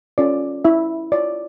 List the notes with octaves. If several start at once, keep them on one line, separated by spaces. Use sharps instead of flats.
C#4 F4 A4 C#5 D5
E4 E5
F4 C#5 D5